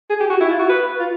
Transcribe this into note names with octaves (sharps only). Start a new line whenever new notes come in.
G#4
G4
F#4
E4
F4
F#4
B4
F4